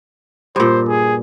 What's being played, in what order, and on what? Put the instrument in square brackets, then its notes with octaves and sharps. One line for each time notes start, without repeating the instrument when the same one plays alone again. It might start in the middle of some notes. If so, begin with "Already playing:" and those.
[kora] G2 A#2 [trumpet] C5
[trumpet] G#4